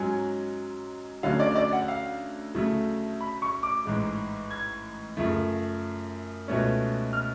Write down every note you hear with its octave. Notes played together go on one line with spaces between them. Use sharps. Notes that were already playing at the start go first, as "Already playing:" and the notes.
Already playing: G#2 F#3 C#4 G#5
D2 D3 F#3 C#4 F5
D5
D5
F#5
F5
D2 C#3 F#3 A3
B5
C#6
D6
A1 G#2 G#3
G#6
F#2 C#3 F3 A3
C#2 B2 A3 C#4
F6